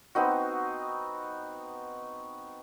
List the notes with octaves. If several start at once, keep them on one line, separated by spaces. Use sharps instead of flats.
B3 C4 D#4 F#4